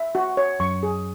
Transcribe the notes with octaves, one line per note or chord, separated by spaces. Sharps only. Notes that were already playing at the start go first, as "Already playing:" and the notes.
Already playing: E5
F#4
C#5
F#2 C#6
G#4